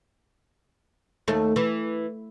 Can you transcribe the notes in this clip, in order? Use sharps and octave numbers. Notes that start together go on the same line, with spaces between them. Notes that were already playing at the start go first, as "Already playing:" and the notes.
D#2 A3
E3